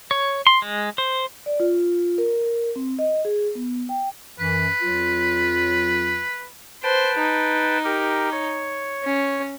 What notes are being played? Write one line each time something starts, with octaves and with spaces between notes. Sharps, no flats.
C#5
C6
G#3
C5
D5
F4
A#4
A#4
C4
D#5
G#4
B3
G5
F#2 E3 B4
F2 F#3 F4
B4 C5 G5 A5
D#4
G4 A#4
C#5
C#4